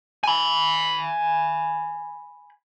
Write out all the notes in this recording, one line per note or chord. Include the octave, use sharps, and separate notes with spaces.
G#5 B5